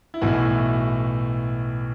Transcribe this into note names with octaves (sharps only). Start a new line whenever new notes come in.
E4
B1 A2 E3 F#4